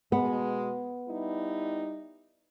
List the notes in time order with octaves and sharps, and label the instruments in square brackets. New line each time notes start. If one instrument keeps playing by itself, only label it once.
[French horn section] B2 G#3 [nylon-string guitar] B3
[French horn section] G3 D#4 E4